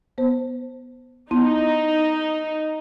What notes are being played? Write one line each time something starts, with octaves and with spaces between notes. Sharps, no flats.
B3 C5
B3 D#4 E4 C6